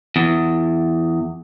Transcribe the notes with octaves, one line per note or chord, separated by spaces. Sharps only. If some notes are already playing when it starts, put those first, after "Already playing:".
E2